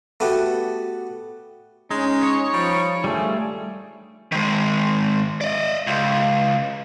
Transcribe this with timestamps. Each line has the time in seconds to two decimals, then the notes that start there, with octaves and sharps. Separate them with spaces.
0.20 A3 B3 F#4 G4
1.91 G#3 C#4 D#4
2.23 C#5
2.53 F3 G3
3.04 G2 D#3 G3 A3 F4 G#4
4.32 D#3 G#3
5.41 D5 D#5
5.87 C#2